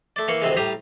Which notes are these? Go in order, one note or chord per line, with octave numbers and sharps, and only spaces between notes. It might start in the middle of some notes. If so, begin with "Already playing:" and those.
A3 D5
E3 A#3 C#6
D2 C3 E3 G#3
A2 G3 G4 A#5 D#6